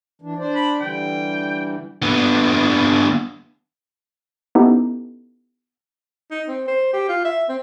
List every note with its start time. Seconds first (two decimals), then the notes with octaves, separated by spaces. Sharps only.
0.22 E3 D4
0.39 D4 C5 D5
0.55 B5
0.81 D3 E3 G3 G5
2.02 D3 B3
4.55 B3 C#4 D#4 E4 G4 A4
6.31 D#4
6.48 C4
6.68 C5
6.94 G4
7.09 F4
7.25 E5
7.49 C4